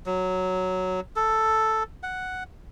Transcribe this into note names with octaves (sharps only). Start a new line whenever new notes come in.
F#3
A4
F#5